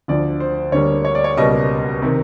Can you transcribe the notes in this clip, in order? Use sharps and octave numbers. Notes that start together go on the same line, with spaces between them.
D2 D3 F3 D5
C5
D2 D3 G3 A#3 C#5
C#5
D5
C#5
C#2 B2 G3 A#3 D#5
C3 D#3